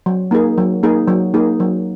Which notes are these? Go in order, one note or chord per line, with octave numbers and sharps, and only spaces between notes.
F#3
A#3 D#4 G#4
F#3
A#3 D#4 G#4
F#3
A#3 D#4 G#4
F#3